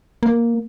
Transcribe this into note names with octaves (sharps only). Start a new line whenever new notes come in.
A#3